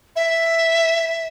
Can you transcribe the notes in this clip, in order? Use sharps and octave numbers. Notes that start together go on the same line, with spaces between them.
E5